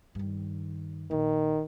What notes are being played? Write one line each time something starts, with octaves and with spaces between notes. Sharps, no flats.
G2 D#3
A#1 D#3